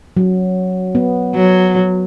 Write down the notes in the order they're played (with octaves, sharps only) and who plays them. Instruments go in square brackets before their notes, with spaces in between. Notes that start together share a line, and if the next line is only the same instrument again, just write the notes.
[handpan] F#3
B3
[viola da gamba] F#3